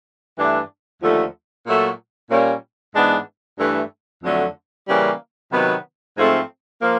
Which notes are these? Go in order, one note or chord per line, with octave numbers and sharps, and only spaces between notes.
G2 E3 A3 D4
D#2 D3 F3 A3
A#2 F#3 A3
A#2 G3 A#3 C#4
G#2 E3 G#3 B3 D4
G2 E3 A3
F2 D3 F#3 A3
C#3 E3 G3 A#3 C#4
C3 D#3 F#3 B3
G#2 F3 A3 C4 F4
F3 A#3